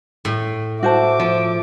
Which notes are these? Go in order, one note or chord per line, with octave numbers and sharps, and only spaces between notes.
A2
F#4 C5 E5 A5 D6
F3